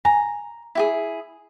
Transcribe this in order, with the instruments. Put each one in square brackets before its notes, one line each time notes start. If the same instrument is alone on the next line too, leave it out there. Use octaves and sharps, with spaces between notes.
[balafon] G#5 [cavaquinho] A#5
[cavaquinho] E4 G4 G#4